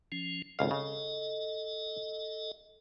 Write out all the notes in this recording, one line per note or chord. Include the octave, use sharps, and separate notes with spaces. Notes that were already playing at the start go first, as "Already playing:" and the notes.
F3 C#4
G#1 C#2 A4 D#5 F5
C#3